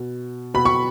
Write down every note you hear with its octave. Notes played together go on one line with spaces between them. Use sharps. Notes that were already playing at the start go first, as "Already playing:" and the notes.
Already playing: B2
B2 B5
C#6